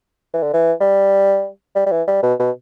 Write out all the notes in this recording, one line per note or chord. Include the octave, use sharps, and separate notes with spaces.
E3
D3
E3
G3
G3
G3
E3
G3
B2
B2